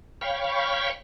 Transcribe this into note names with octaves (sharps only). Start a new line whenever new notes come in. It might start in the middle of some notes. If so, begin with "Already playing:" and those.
C#5 F5 G5 B5 C#6